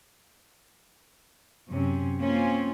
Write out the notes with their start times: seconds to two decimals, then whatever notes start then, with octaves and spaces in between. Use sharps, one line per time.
1.70 F#2 C3 C#4
2.21 A#3 C4 C#4 F4